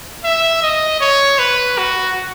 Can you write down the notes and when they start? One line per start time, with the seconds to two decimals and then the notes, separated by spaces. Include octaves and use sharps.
0.24 E5
0.62 D#5
1.01 C#5
1.39 B4
1.78 F#4